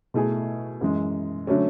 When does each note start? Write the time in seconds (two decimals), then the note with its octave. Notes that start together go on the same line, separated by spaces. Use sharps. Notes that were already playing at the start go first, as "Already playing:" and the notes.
0.14 B2 A3 E4 G#4
0.81 F#2 E3 G#3
1.47 D3 F#3 A3 C#4